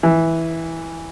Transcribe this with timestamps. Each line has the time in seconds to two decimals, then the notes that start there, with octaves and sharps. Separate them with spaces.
0.03 E3